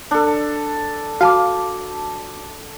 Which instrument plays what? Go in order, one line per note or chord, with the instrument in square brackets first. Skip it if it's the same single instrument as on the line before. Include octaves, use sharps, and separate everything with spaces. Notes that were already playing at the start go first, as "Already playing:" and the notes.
[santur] D4 A4
[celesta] F#4 A5 D6 [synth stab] F5